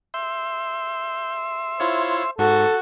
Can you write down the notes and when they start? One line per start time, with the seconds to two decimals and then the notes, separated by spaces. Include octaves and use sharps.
0.14 E5 C6 G6
1.80 E4 F4 C5 C#5
2.38 G#2 F#4 A4 C#7